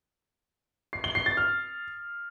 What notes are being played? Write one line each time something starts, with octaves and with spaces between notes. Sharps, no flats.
C7
G7
C7
A6
F6